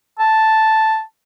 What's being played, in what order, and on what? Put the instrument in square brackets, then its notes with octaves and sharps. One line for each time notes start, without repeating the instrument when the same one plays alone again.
[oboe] A5